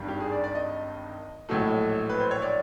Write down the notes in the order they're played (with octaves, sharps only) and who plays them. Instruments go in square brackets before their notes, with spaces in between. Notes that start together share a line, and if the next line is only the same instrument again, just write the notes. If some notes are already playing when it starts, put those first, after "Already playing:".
Already playing: [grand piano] G#1 G2 D#3 G3
G4
G#4
D5
D5
D#5
A#1 A2 F#3 A3
B4
C5
C#5
D5